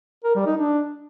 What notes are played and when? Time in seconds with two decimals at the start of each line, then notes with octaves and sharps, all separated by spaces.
0.24 A#4
0.35 G3
0.46 D#4
0.57 D4